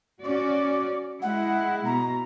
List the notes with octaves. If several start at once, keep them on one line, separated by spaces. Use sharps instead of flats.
C#4 F#4 D5 D6
G#3 E4 F#5
B2 A#5